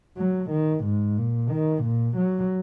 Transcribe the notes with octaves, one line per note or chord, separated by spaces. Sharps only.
F#3
D#3
G#2
A#2
D#3
A#2
F#3